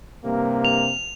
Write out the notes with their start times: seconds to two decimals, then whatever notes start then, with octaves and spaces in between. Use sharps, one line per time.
0.25 G2 C3 A#3
0.65 F7